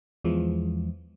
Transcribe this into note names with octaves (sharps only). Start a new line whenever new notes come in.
E2 E3 F3 G#3